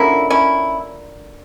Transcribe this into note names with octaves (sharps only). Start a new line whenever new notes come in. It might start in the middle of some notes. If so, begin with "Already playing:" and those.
Already playing: D3 F3 A#3 C#4 E4
C#4 E4